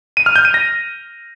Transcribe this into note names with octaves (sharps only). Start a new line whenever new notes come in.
D#7
F6
G6
D#7
A#6